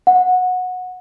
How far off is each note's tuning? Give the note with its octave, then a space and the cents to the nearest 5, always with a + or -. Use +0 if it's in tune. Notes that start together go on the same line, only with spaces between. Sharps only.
F#5 -15